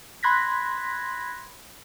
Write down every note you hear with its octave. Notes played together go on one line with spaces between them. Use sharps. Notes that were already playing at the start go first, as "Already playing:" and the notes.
B5 C6 F#6 G#6 A#6 B6